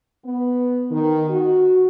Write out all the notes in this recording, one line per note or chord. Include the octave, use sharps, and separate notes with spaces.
B3
D#3
F#4